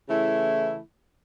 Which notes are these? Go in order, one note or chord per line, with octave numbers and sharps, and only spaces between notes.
C#3 E3 A3 E4